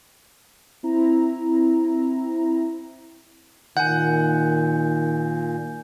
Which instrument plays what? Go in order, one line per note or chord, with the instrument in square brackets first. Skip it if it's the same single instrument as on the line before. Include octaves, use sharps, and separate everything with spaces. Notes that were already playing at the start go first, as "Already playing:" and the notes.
[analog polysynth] C4 E4 A#5
[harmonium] A#2 [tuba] D#3 [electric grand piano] F#5 [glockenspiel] G#5 G6